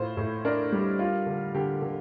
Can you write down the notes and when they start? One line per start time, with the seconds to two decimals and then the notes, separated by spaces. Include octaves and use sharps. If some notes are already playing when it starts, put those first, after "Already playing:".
Already playing: A2 F4 C5
0.17 A2
0.45 D4 A#4
0.72 G3
0.99 F4
1.26 D3
1.54 D3 G4
1.82 D3